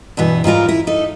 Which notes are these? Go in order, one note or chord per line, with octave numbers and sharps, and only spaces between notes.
G2 B2 E3 B3
G#2 G3 F4 A#4
E4
D#4 A4